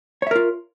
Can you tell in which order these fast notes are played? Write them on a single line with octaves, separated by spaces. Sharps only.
C#5 E5 A#4 F4